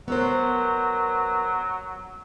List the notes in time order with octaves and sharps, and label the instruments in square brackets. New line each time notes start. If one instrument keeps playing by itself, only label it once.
[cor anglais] F#3 [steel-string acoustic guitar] B3 A#4 C5